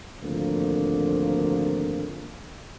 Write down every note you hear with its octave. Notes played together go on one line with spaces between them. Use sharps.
G#1 D2 D3 F3 A#3